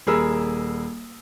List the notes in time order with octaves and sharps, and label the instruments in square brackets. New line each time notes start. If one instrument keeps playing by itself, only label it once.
[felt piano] D#1 G#4 A#4 B5 E6